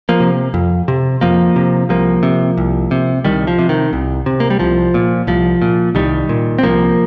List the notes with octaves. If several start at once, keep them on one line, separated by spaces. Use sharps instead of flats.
F3 A#3
C3
F2
C3
F2 F3 A#3
C3
C2 F3 A#3
C3
C2
C3
C2 D#3 G3
F3
C3
D#3
C2
C3
A#3
G3
C2 F3
A#2
C2 F3
A#2
C2 D#3 G3
A#2
C4
C2 F3 A#3